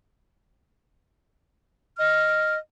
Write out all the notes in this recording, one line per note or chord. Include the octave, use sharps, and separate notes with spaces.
D#5 F6